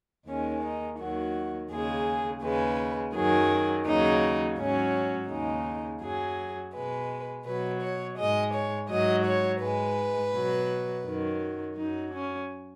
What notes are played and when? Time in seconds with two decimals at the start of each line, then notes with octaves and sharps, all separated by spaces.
0.27 D#2 D#3 G#3 C#4
0.63 D#4
0.99 D#2 D#3 F#3 F#4
1.71 D#2 C#3 G#3 G#4
2.42 D#2 C#3 G#3 B4
3.15 F#2 D#3 F#3 G#4
3.86 D#2 C#3 F#3 D#4
4.58 G#2 F#3 C#4
5.30 D#2 C#3 G#3 D#4
6.01 F#2 F#3 G#4
6.74 B2 G#3 B4
7.46 B2 F#3 B4
7.82 C#5
8.18 G#2 G#3 D#5
8.53 C#5
8.89 G#2 F#3 D#5
9.25 C#5
9.61 G#2 G#3 B4
10.33 B2 F#3
11.05 F#2 D#3 F#3
11.77 F#2 F#3 D#4
12.12 C#4